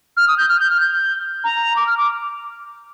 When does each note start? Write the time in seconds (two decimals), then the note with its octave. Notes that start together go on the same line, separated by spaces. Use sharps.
0.17 F6
0.28 D#6
0.38 G6
0.49 F6
0.60 G6
0.70 F6
0.80 G6
1.44 A#5
1.76 D6
1.87 F6
1.97 D6